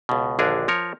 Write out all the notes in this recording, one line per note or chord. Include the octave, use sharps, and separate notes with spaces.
C#2 B2
A#1 D#2 D3 D4 G#4 A#4
F3 A#4 C#5